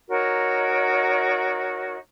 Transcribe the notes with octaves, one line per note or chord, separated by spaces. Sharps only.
D#4 F#4 A#4 C#5